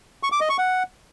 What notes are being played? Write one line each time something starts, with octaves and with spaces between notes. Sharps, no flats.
C#6
D6
D#5
C#6
F#5